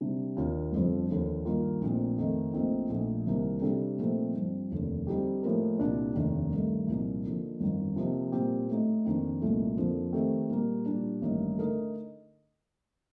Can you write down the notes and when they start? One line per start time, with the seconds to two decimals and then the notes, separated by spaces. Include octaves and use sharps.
0.01 C3 G3 D4
0.36 D#2 D#3 A#3 D4 F4
0.72 G1 F2 D3 F3
1.09 D#2 D3 F3
1.45 G2 D#3 A#3 F4
1.81 A#1 A#2 A3 C4
2.18 F2 D#3 A3 D#4
2.54 A#1 A#2 A3 C4 D#4
2.90 A#1 A#2 A3
3.27 C2 C3 D#3 A#3
3.62 C3 G3 D4 A4
3.98 A#2 F3 A3 C4 D#4
4.34 G2 F3 C4
4.71 F1 D#2 D3
5.07 D3 G3 C4 D#4 G4
5.43 A2 F3 A#3 D#4 A#4
5.79 C2 A#2 G3 D4
6.15 F1 D#2 D#3 A3 D4
6.52 G2 D#3 A3
6.87 C2 A#2 F3 A#3 D#4
7.24 D3 F3 A#3 D#4
7.60 G1 F2 D#3
7.96 C3 F3 A#3 D#4
8.32 A#2 G3 C4 G4
8.69 A2 A3 D#4
9.05 F2 D#3 A#3 D4
9.41 C2 A#2 A3 D#4
9.77 F2 D3 F3 A#3
10.13 D#3 A3 C4 G4
10.49 A#2 G3 A#3
10.86 A#2 G3 D4
11.22 A1 G2 D#3 A#3 D#4
11.58 D3 A3 D#4 A#4 D#5